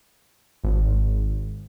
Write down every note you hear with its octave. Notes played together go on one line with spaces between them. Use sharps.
G#1